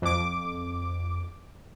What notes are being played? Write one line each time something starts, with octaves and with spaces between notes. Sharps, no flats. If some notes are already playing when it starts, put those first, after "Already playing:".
F2 D6